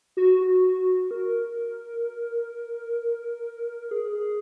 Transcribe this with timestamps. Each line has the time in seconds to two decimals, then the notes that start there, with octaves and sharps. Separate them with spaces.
0.17 F#4
0.41 F#4
1.11 A#4
3.91 G#4